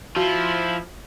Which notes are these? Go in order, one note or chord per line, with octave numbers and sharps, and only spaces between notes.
F3 E4 F#4